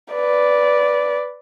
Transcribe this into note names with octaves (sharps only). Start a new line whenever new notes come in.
B4 D5